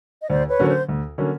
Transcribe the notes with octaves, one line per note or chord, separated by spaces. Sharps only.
D#5
D2 C5 D5
B4 C#5
D3 F#3 A#3 C#4 C#5
C5
D2
D3 F#3 A#3 C#4